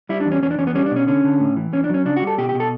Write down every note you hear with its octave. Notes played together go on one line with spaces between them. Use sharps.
G3 E4
D4
E2
C#4
E2 C#4
D4
E2 C#4
B3
G3 C#4
D4
B2 C#4
D3 C#4
D3
A2
E3
E2 C#4
D4
F#3 C#4
C#3 D4
F#4
G3
A4
B2 G4
G4
B2
A4